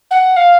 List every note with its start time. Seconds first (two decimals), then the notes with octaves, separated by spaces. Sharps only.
0.11 F#5
0.36 F5